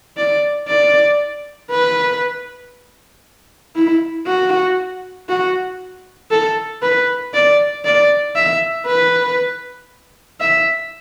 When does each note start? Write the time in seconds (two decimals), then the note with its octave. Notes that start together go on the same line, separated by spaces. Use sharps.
0.17 D5
0.68 D5
1.71 B4
3.76 E4
4.27 F#4
5.29 F#4
6.31 A4
6.83 B4
7.34 D5
7.85 D5
8.36 E5
8.87 B4
10.40 E5